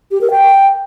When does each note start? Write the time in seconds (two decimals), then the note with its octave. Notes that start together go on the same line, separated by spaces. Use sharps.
0.11 G4
0.21 A#4
0.31 G5